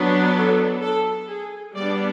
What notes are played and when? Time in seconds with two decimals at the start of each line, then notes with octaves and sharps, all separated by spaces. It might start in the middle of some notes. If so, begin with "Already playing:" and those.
Already playing: F#3 B3 D4
0.35 A4
0.81 A4
1.28 G#4
1.75 G3 B3 D4 D5